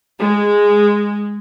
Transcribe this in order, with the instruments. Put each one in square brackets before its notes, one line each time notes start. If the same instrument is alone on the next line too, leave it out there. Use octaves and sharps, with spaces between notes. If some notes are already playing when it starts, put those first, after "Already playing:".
[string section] G#3